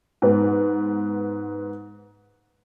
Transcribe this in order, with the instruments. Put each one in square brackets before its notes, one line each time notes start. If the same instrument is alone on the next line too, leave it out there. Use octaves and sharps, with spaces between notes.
[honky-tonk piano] G#2 B3